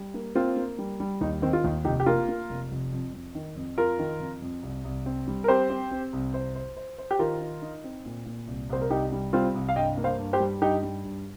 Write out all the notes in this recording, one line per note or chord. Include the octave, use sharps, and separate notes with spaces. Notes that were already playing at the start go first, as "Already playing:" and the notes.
Already playing: G3
A#3
A#3 C4 F4
A#3
G3
G3
D#2 D#4
D#3 C4
F4
D#2 D#4
F1 D#4 G4
G4
A#3 F4 A#4
A#3
F1
F1
F2
F2
D#3
F2
F2 F4 A#4
D#3
F2
F2
C2
C2
C4
G3
A#4
C4 G4 C5
C4
C4
C2
C5
C5
C5
C5
G4
D#3 F4 A#4
D#4
D#4
C4
A#2
A#2
C2
C2 C5
A#4
C2 D#4 G4
G3
G3 C4 F4
C2
F5
G2 D#5 G5
A#3
C5 F5
G2
G4 C5
G3
G2 D#4 G4
G3
G2